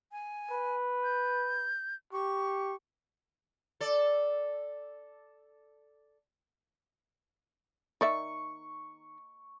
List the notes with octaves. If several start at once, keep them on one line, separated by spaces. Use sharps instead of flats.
G#5
B4
G6
G4 C#6
A4 D5
D#3 D5 E5 C#6